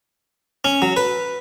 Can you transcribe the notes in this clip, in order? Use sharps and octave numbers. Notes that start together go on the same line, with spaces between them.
C#4
F#3
B4